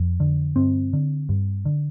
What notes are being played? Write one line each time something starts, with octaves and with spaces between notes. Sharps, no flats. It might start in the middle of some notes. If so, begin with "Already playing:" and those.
Already playing: F2
D3
G2 C4
D3
G2
D3